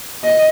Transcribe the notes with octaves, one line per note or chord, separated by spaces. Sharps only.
D#5